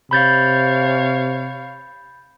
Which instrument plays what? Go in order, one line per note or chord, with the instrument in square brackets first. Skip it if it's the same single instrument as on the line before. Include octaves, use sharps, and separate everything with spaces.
[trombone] C3 [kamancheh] C#5 F5 [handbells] B5 G6 A6